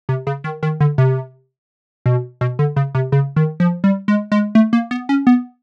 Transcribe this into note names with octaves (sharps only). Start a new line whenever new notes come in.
C3
C#3
D#3
D#3
D3
C3
B2
B2
D3
C#3
C3
C#3
D#3
F3
G3
G#3
G#3
A3
A#3
B3
C#4
B3